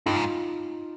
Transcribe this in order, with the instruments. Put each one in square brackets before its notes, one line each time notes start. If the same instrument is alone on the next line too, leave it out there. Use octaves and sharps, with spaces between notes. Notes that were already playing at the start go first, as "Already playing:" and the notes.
[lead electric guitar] G2 [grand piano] D#4 F4
[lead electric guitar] G#2